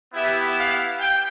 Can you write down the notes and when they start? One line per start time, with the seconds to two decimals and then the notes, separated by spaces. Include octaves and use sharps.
0.13 B3 E4 G4 E5
0.57 F5
1.00 G5